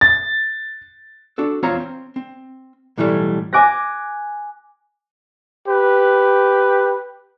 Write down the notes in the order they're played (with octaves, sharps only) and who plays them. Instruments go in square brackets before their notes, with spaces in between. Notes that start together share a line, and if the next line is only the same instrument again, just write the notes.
[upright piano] A6
[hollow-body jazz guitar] D4 F#4 A4
E2 C4 F4 C#5 F5 A#5
C4
C4
B1 A2 E3 F#3 G3 A3
[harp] G#5 D6 F#6 A#6
[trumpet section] G4 B4